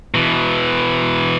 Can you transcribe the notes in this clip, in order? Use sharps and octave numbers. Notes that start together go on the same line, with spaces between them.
B2 E3